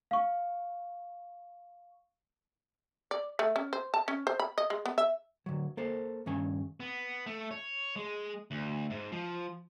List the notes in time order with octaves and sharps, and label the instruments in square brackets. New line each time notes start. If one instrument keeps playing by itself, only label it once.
[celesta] F5 C#6
[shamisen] D5
A3
C#4
C5
A5
C#4
C5
B5
D#5
G#3
B3
E5
[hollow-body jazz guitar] D3 F#3
A#3 A4 C5
G2 D#3 C#4 G#5
[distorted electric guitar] B3
A3
C#5
G#3
D2
G#2
F3